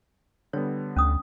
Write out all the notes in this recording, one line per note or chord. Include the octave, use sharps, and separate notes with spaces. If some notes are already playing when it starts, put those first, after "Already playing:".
D3 G3 B3 C#5
D2 C#4 D4 D#6